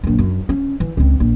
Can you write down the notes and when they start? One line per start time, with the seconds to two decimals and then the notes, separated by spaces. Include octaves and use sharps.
0.04 A#1 F#2
0.19 F#2
0.49 C#4
0.80 E3
0.97 C#2 C4
1.20 A#1